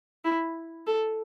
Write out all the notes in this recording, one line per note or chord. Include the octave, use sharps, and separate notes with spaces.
E4
A4